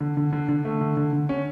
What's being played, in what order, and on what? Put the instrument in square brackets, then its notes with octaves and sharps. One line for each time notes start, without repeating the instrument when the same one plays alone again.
[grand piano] D3
D3
D3
D3
A3
D3
D3
D3
C#4